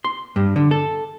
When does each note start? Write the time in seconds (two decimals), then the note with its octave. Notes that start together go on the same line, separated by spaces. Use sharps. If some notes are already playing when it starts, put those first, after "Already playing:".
0.04 C6
0.36 G2
0.56 D3
0.71 A4